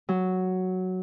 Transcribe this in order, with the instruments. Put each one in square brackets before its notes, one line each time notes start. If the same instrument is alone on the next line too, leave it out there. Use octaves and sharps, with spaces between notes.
[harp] F#3